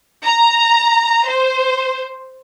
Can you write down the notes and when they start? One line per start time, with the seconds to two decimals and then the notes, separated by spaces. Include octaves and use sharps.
0.24 A#5
1.27 C5